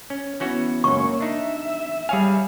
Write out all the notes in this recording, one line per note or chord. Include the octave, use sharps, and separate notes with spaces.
C#4
E3 B3 C#4 E4 F#4
C#2 F#2 A#3 C#5 C#6
D4 D#4 E5
G3 G#4 C#5 F5 G#5